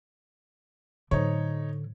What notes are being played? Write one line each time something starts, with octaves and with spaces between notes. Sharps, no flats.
A2 D3 F#3 D#4 C5 C#5